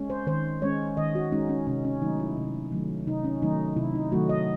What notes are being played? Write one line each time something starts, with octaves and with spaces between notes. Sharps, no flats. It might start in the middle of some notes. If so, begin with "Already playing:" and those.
Already playing: G#3 C#4
C5
D#3 C5
G#3 C#4 C#5
D#3 D#5
F#4
G#3 C#4 D#4
C#4
C3 C#4
C#4
D#3 F#3 A3 D#4
E4
C3
D#3 F#3 A3
C3 D#4
C#4
D#3 F#3 A3 D#4
C3 E4
D#4
D#3 F#3 A3 F#4
D#5